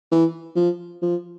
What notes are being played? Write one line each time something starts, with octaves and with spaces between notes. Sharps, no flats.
E3
F3
F3